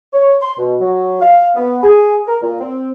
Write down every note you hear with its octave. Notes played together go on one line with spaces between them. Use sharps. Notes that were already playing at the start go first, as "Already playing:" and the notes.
C#5
C6
B2
F#3
F5
B3
G#4
A#4
A#2
C4